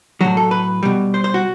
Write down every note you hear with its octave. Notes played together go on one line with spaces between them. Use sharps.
A2 F#3 F#4
A4
B4
B2 G3
C5
C5
F#4